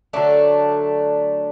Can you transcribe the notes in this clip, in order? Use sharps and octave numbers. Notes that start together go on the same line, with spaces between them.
D3 F#3 A3 D4